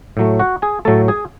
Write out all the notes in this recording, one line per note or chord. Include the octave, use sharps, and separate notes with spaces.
A2 F#3 A3
F#4 F#5
G#4 G#5
A2 F#3 A3 A4 A5
G#4 G#5